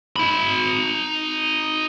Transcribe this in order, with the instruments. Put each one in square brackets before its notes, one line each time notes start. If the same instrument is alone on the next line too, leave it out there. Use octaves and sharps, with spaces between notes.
[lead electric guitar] D#4 B5